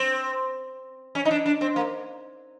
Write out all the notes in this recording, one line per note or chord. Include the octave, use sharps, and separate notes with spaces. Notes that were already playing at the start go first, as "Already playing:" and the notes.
Already playing: C4
C#4
D#4
D4
D4
C4
A#3